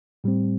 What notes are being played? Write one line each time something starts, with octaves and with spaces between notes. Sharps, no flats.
A2 G3 C4